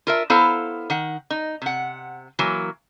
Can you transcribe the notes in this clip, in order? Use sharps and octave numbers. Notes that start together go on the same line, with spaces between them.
F4 A#4 E5
B3 E4 A4 C5 F5 A#5
D#3 F#5
D#4
C3 F#5
E3 F#3 A#3